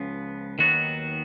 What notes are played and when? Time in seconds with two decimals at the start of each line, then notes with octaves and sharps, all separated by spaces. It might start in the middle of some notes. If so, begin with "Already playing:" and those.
Already playing: C#2 C#3 F3 B3
0.59 D#2 D#3 F#3 B3 F#4